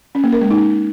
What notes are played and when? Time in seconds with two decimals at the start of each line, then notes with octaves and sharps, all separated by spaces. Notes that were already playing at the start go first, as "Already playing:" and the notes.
0.15 C#4
0.24 A#3
0.33 A#4
0.42 G#3
0.50 D#4